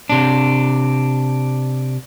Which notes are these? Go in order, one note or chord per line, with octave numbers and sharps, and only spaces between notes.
C3 D4